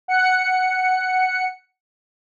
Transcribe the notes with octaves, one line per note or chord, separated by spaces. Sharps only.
F#5 C#7